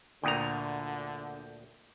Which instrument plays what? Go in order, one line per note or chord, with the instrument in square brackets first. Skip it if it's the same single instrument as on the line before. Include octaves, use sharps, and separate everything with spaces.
[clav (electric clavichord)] D2 A#2 A#5 [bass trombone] D3 [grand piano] G5 D#6